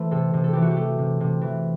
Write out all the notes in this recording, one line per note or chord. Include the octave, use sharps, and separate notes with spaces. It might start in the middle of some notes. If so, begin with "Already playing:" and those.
Already playing: E3 A3 C5
C3 A4
C3
A4
E3 G4
F#4
G4
A3
C3
C3
E3